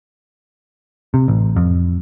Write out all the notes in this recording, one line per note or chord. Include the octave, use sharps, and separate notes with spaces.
C3
A1
F2